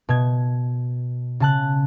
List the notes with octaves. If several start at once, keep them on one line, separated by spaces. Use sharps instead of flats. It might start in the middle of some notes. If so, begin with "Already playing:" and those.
B2 G#6
C#3 A5 F#6